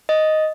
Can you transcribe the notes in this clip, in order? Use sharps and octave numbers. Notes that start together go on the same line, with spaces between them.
D#5